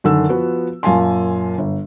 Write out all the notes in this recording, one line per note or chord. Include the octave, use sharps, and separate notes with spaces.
F#2 D3 D#3 E6
F3 B3 F#4
F#2 A#2 F5 G#5 A5 C6
G1